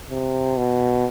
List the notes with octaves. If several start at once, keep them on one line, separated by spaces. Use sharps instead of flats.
C3
B2